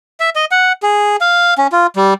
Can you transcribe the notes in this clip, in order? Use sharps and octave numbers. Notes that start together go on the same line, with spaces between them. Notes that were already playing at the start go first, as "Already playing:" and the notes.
E5
D#5
F#5
G#4
F5
C#4
F4
G3